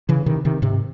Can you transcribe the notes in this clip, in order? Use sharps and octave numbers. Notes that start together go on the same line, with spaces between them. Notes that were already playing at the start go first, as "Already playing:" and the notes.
C#3 E3
C3 D#3
C3 D#3
G#2 C3